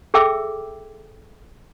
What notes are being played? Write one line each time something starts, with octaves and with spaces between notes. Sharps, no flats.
G#4 A4 E5 G5 D6 E6